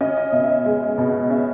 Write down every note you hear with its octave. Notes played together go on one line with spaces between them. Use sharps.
C#4 D#5
D#5
B2 E5
E5
D#5
G#3
B2
C#4 E5